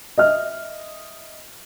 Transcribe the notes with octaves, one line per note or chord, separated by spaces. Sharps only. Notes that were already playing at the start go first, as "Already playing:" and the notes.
D#5 E5 F6